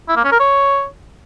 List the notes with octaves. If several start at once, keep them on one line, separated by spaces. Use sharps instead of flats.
E4
A#3
C#4
A#4
C#5